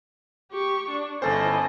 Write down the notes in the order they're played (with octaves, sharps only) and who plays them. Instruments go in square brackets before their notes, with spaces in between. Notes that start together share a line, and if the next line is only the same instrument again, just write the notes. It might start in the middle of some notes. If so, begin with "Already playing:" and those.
[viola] G4 C#6
D4
[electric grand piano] G1 A4 C5 [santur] C#4 A5 [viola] E4 D#5